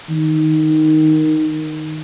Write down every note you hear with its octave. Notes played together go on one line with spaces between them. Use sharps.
D#3